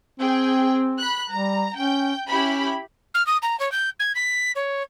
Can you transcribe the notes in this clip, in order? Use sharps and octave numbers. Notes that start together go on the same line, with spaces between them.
C4 G#4 G5
B5 F#6
G3 A#5
C#4 G5 G6
C#4 E4 G4 B5
F6
D#6
A#5
C#5
G6
G#6
B6
C#5